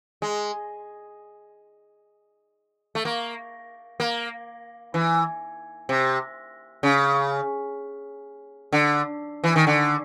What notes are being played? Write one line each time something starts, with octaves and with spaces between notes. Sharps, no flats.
G#3
A3
A#3
A#3
E3
C3
C#3
D3
E3
D#3
D3